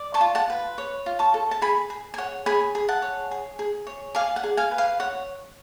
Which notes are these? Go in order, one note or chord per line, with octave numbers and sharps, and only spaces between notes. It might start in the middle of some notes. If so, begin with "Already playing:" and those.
Already playing: D5
A5 C#6
F4
F#5 A5
B4
C#5
F4
A5 C#6
A4
A5
G#4 G#5 B5
G#4
G#5
C#5 F#5
G#4 G#5 B5
G#4
F#5 A5
C#5
G#4
G#4
C#5
D5 F5 G#5
F#5
G#4
F5 G#5
B4
F5 G#5
C#5 F#5